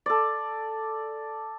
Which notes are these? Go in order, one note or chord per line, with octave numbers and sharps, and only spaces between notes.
A4 D5